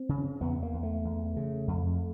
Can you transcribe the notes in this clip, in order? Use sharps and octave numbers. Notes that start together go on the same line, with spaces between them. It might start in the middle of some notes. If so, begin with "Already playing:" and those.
Already playing: C4
C#3
E2 B3
A#3
E2
A3
E2
C#3
F2